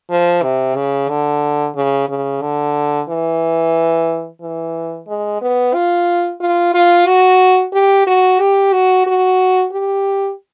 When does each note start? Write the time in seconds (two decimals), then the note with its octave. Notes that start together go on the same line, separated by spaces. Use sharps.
0.10 F3
0.42 C3
0.76 C#3
1.09 D3
1.76 C#3
2.09 C#3
2.42 D3
3.09 E3
4.41 E3
5.08 G#3
5.42 B3
5.74 F4
6.40 F4
6.74 F4
7.07 F#4
7.73 G4
8.07 F#4
8.39 G4
8.73 F#4
9.07 F#4
9.72 G4